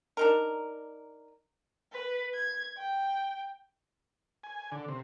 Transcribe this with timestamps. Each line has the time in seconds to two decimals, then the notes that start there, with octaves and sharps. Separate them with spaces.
0.17 D4 D#4 A#4
1.91 B4
2.34 G#6
2.78 G5
4.44 G#5
4.72 D3
4.88 C3